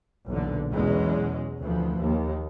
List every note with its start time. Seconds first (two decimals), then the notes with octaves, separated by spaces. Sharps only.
0.26 B1 E2 A#2 D3
0.72 E2 B2 F#3 G#3 C#4
1.61 D2 E3 F3
1.98 D#2